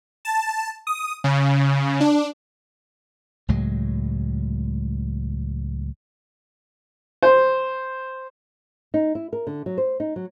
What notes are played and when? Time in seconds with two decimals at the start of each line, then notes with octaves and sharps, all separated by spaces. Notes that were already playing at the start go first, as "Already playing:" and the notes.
0.25 A5
0.87 D#6
1.24 C#3
2.00 D4
3.48 C#2 A2 F#3 G#3
7.22 C5
8.94 D#4
9.15 E4
9.33 A#4
9.47 D3
9.66 F#3
9.78 C5
10.00 D#4
10.16 F#3